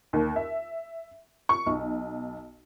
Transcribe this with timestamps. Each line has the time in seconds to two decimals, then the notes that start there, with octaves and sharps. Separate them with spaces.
0.13 D#2
0.36 E5
1.49 C#6
1.66 B1